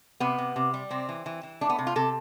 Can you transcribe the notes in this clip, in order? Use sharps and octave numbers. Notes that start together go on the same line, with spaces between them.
C3 B3
C3
C3
G3
C3 C4
E3
E3
E3
A3 D4
B3
C3
F4
C3 A4